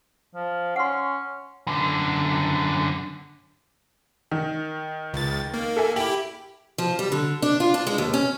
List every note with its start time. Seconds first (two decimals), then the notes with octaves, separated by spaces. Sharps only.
0.35 F3
0.76 C#4 F#5 C6
1.67 F#2 D3
4.32 D#3
5.13 C#2 A6
5.54 A#3
5.76 A4 E5 G#5
5.96 E4 G4 F#7
6.78 F3
6.99 G3
7.12 D3
7.42 D4
7.60 F4
7.74 D4
7.87 G#3
7.98 D#2
8.14 C#4